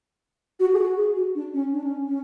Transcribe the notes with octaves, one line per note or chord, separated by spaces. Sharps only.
F#4
G#4
F#4
G#4
F#4
D4
C#4
D4
C#4
C#4